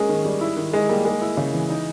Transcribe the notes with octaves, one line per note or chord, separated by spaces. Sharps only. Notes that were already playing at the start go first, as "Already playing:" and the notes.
Already playing: G#3 A#3 C#4 G#4
D#3
G3
E4
D#3
D#3 G#3
G3 A#3
G#3 A#3
E4
C#3
E3
D#4